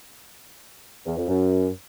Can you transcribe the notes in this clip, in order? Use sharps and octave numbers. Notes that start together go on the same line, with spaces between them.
E2
F2
F#2